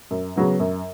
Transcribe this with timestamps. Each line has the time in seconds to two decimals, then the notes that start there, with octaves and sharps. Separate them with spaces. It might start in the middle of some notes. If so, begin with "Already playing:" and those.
0.11 F#2
0.36 C#3 F#3 B3
0.60 F#2